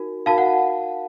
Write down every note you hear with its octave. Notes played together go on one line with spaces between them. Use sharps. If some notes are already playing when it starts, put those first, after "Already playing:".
Already playing: D#4 F#4 A#4
D#4 F#4 A#4 F5 A5
F#5